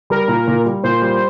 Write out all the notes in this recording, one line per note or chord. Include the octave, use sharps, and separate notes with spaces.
G3 A#4
A#2
A#2
G3
A#2 C5
G3